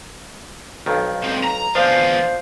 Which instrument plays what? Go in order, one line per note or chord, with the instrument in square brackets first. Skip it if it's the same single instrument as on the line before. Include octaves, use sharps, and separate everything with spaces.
[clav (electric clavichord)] B1 F2 D#3
[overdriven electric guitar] C#2 C4
A#5
[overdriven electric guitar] E2 F4 [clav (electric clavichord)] F3 D4 [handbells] C5 F5